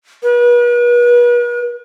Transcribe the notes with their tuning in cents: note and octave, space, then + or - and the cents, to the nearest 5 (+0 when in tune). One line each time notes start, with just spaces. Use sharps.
B4 -40